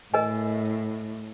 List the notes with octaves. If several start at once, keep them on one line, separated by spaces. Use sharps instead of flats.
A2 A#4 D#5 G#5